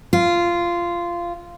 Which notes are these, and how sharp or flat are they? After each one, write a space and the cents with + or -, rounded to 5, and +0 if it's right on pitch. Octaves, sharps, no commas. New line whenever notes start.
F4 -15